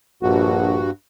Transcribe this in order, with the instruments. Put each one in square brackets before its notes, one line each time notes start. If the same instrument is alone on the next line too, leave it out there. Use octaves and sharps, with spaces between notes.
[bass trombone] A#1 [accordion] G2 F#4